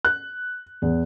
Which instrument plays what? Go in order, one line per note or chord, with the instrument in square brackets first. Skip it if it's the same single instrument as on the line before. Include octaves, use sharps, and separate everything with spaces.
[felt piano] F#6
E2